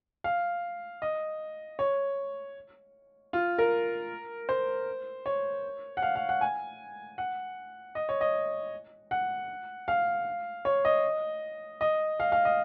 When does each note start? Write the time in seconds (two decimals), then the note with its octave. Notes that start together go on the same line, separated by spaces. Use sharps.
0.24 F5
1.02 D#5
1.79 C#5
3.33 F4
3.58 A#4
4.49 C5
5.26 C#5
5.97 F#5
6.02 F5
6.16 F5
6.29 F#5
6.41 G#5
7.18 F#5
7.95 D#5
8.09 C#5
8.21 D#5
9.11 F#5
9.88 F5
10.65 C#5
10.85 D#5
11.81 D#5
12.20 F5
12.32 F5
12.45 D#5